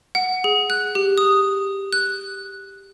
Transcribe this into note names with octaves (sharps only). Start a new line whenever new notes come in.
F#5
G#4
F#6
G4
D#6
F#6